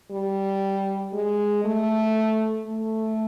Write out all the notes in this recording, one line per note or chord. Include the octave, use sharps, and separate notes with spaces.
G3
G#3
A3
A3